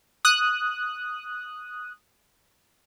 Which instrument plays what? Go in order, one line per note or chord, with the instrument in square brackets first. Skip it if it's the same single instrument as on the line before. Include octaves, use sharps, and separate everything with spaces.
[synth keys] D#6 F#6